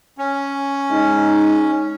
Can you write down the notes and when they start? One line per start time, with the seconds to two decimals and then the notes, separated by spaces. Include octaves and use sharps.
0.18 C#4
0.91 G#3 D#4